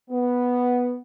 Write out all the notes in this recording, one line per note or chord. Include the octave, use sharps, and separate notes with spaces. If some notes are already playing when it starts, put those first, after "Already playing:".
B3